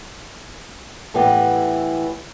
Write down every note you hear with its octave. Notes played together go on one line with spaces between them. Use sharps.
A2 E3 B3 G4